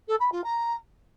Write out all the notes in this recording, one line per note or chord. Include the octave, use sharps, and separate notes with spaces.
A4
B5
F4
A#5